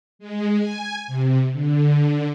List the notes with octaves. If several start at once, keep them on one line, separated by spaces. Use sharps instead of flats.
G#3
G#5
C3
D3